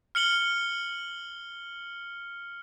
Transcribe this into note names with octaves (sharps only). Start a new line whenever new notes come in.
F6 C#7 F#7 G7